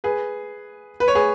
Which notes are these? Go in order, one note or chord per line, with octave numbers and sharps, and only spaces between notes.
G#4 B4
B4
C#5
G#4 B4